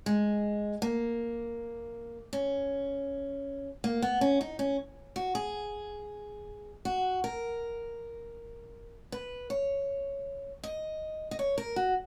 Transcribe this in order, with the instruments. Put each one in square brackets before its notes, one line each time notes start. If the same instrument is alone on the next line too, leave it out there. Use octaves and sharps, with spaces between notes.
[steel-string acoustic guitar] G#3
A#3
C#4
A#3
B3
C#4
D#4
C#4
F#4
G#4
F#4
A#4
B4
C#5
D#5
D#5
C#5
A#4
F#4